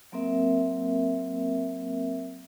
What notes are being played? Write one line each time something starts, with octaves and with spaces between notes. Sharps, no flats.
F#3 A#3 C4 A#4 E5